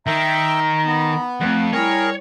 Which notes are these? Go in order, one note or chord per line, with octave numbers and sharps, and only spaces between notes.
D#3 E5 G5 A#5
B3
F2 A3 C4 F#5
G3 E4 G#4 A#4 C#5 G5